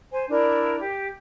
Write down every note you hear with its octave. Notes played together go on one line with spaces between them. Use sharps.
C5 G#5
D4 E4 A#4 D5
G4